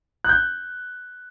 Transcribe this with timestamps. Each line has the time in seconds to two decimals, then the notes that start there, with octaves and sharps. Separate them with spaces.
0.24 F#6
0.29 G6